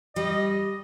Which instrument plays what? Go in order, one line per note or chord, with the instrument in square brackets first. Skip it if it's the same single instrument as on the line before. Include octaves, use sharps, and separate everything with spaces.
[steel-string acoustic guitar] G3 [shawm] D#5